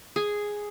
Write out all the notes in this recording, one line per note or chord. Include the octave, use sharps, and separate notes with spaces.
G#4